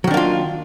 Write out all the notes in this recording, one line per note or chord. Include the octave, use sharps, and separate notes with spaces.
D#3 F#3 A#3 D4 F4